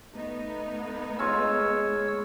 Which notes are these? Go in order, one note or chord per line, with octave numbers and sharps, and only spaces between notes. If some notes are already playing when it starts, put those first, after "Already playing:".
A3 B3 D#4
G#3 F4 C#5 E6